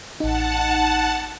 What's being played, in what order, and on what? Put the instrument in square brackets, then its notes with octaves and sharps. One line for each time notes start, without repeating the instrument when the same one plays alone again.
[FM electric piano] A1 D#4 [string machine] F#5 A5